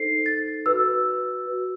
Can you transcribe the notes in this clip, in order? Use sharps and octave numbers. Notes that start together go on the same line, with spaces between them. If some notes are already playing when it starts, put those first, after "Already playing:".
Already playing: D#4 A4 C5 C7
A6
F#4 B4 E6
F#4 B4